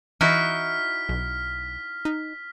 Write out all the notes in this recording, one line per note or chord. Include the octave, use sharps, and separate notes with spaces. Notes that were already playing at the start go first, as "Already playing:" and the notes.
E3 D#4 E4 F#4 F6 B6
B1
D#4